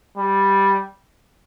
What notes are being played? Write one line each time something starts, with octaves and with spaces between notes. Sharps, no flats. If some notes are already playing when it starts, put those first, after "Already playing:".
G3